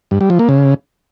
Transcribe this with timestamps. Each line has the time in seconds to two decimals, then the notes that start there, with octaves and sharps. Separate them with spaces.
0.11 G2
0.21 G3
0.30 F3
0.39 A#3
0.49 C#3